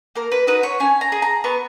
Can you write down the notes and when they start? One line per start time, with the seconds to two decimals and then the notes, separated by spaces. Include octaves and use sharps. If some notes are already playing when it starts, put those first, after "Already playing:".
0.15 A#3 A#4
0.32 B4
0.47 D#4 F#4 B4
0.63 C#5
0.80 C#4 G#5
1.01 A#5
1.12 G#4
1.22 A#5
1.44 B3 C#6